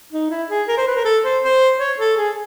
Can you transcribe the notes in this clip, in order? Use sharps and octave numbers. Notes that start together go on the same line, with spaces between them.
D#4
E4
G#4
A#4
C5
B4
A#4
A4
C5
C5
C#5
A4
G#4